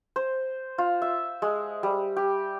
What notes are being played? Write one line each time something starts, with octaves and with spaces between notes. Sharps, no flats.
C5
F4
E5
G#3
G3
G4